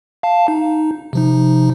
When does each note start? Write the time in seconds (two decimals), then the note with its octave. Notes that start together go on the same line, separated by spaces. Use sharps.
0.23 F5 A5
0.48 D#4
1.13 C3 F3 D#4